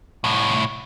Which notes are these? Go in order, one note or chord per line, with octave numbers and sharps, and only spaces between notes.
C2 A2